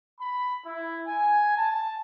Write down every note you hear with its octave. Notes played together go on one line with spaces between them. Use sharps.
B5
E4
G#5
A5